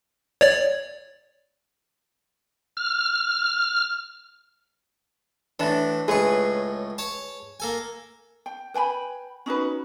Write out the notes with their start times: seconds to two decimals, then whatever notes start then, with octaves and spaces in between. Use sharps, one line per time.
0.41 C#5 D5
2.77 F6
5.60 A2 E3 D4
6.08 C#2 A2 G#4 B4 C#6
6.98 C#5 A5
7.60 A#3 A4 G#5
8.46 G5
8.74 B4 G5 G#5 B5
9.46 C#4 D#4 F#4 B4